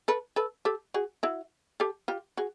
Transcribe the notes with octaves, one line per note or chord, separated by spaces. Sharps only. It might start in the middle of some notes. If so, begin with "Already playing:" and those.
A4 B4
A4 B4
G4 A4
F#4 G#4
E4 F#4
G4 A4
F4 G4
F#4 G#4